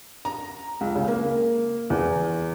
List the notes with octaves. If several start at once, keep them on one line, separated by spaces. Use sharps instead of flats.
A#5
C#2
C#3
A#3
E2